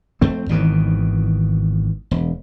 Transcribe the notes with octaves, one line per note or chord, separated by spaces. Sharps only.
F2 A3 C4
G#1 B2 D#3 E3
E1